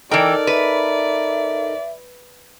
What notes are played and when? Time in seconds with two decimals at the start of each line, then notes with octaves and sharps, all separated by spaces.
0.11 E3 D#4 A4 A#4 D5 G5
0.47 B4 E5